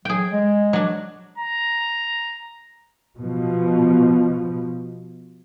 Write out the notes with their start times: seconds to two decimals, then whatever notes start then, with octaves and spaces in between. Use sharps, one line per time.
0.05 F#3 G#4 G5
0.31 G#3
0.73 F#3 D4
1.38 A#5
3.19 B2 F3